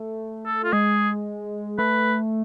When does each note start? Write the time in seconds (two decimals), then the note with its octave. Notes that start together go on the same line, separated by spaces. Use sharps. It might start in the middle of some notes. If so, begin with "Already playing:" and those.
Already playing: A3
0.46 A4
0.64 F4
0.72 G#3 G#4
1.78 A3 B4